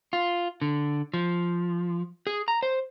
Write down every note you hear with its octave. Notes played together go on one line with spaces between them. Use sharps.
F4
D3
F3
G#4
A#5
C5